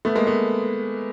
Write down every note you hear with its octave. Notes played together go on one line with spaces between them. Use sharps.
A3 B3
G#3 A#3
A3 B3